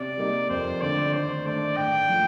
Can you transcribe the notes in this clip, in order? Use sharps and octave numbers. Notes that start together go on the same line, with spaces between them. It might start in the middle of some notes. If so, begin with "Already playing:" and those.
Already playing: C3 D5
G3 A#3 D#4
F2 C5
D3 A3 D5
D#3 C5
A3 D4 D5
A2 G5
F3 A3